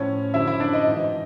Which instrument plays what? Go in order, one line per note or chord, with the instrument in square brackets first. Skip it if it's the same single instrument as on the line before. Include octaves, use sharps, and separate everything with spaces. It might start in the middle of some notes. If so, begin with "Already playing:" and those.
Already playing: [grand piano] A2 F3 C#4 C#5
F#2 D3 F3 E4 E5
E4 E5
D4 D5
D#4 D#5
G#2 E3